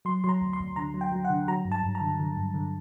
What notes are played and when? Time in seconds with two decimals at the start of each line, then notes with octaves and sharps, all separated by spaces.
0.05 F#3 C6
0.24 F#3 A#5 C6
0.41 D2
0.53 C6
0.59 D2
0.76 D3 A#5
0.94 F#3
1.01 G5
1.12 F#3
1.25 F#5
1.30 D3
1.48 F#3 A#5
1.65 G2
1.72 A5
1.83 G2
1.95 A#5
2.01 D3
2.19 D3
2.36 G2
2.54 D3